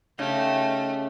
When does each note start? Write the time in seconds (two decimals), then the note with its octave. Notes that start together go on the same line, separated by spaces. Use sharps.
0.19 C#3 A3 D#4 G4